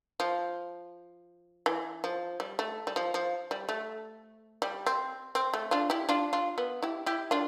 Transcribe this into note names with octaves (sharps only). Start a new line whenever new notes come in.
F3
E3
F3
G3
A3
G3
F3
F3
G3
A3
G3
C4
C4
A3
D4 F4
E4 G4
D4 F4
D4 F4
B3
E4 G4
E4 G4
D4 F4